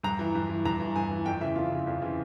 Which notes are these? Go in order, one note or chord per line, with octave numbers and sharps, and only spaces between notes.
G2 A#5
E3
G2
E3
G2 A#5
E3
G2 G#5
E3
F2 G5
C#3 E3 E5
F2 F4
C#3 E3
F2
C#3 E3